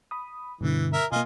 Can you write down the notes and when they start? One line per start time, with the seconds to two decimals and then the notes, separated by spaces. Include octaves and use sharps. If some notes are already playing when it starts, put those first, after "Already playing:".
0.11 B5 D#6
0.61 G2 B2 D3 E3
0.93 A#4 E5
1.12 B2 A#3 F4 D#5 G#5